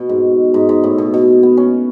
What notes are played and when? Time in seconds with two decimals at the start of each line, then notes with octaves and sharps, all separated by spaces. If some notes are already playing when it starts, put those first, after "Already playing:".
Already playing: B2
0.09 G#2
0.54 G#2
0.69 G#2
0.84 A2
0.98 B2
1.14 B2
1.43 B3
1.57 C#4